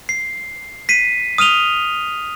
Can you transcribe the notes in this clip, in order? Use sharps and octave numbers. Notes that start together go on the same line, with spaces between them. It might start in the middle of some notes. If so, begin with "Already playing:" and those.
C7
B6 C7 D#7
D#6 F6 D#7 F7 G7